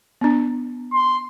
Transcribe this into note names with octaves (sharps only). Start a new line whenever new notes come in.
B3 D4
C6